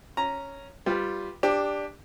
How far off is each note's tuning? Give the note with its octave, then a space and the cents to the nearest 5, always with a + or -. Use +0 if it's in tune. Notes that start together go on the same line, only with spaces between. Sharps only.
C#4 +0 A#5 +0
G3 +0 F4 +0 B4 +0
D4 +0 G4 +15